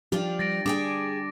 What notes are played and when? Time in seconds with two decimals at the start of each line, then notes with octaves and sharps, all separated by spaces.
0.12 F3 D4 F4 G4
0.39 G3 A6 A#6 D7
0.66 D4 G#4 G5 G#5 D6